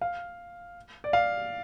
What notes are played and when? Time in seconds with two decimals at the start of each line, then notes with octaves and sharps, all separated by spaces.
0.01 F5
1.04 D5
1.13 F5